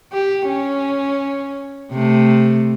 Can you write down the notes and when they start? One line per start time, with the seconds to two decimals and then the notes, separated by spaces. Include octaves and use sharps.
0.12 G4
0.47 C#4
1.92 C3 A3